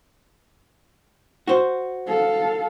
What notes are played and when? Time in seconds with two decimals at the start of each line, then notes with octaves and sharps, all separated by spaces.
1.48 F#4 C5
2.07 A4 F5